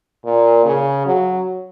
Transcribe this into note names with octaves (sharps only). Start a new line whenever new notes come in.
A#2
C#3
F#3